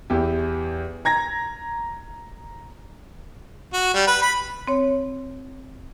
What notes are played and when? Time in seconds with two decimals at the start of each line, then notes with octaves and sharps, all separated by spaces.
0.10 E2 E4 G4
1.05 A#5 G#6 A#6
3.73 F#4
3.94 G3
4.07 B4
4.22 B5
4.68 C4 C#5